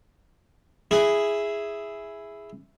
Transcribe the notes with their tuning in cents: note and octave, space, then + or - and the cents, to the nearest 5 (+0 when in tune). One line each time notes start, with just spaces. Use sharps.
E4 +0 G#4 +0